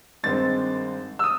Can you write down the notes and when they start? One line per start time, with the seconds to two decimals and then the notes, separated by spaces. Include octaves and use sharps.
0.23 G#1 G2 D#3 G#3 C4 A6
1.19 E6
1.24 D#6